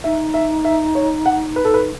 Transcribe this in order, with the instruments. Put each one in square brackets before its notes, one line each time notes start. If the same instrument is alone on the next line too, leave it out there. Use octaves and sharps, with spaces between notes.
[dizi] D#4 [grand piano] E5
[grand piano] E5
E5
C#5
F#5
B4
A4
B4